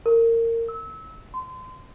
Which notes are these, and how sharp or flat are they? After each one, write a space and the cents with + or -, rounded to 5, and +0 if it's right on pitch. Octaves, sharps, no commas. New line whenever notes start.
A#4 -25
E6 -25
C6 -30